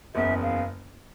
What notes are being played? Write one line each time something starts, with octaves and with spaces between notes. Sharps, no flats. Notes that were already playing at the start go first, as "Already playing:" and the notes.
F#1 E2 C#3 E5
F5